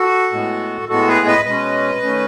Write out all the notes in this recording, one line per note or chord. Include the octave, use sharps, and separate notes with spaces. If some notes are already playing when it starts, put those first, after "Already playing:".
Already playing: F#4 A4
A2 G#3 B3
A2 G#3 B3 F#4 A4
G#4 B4
B4 D#5
B2 G#3 C#4 B4 D#5
D#3 A3 C#4